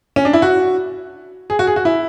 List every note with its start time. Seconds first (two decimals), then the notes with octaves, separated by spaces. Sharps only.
0.16 C#4
0.25 D4
0.33 E4
0.42 F#4
1.50 G#4
1.59 F#4
1.67 G#4
1.76 F#4
1.85 E4